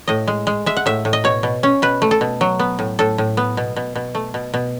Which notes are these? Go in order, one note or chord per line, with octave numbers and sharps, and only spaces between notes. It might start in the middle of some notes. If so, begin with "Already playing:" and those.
A2 D#5
G#3
G#3
G#3 E5
F#5
A2 E5
A2
D#5
B2 C#5
B2
C#4
B2 B4
A3
A4
B2
F#3
B3
A2
A2 A4
A2
B3
B2
B2
B2
A3
B2
B2